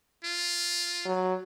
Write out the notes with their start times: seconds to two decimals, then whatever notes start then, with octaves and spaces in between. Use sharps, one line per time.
0.24 F4
1.05 F#3